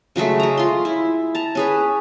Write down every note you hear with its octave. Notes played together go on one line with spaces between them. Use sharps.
C#3 F#3 G#3 A3
G#3 A#5
F4 C6
E4
A5 A#5
C#4 G#4 B4